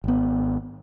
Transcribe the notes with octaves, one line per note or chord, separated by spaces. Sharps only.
G#1 B3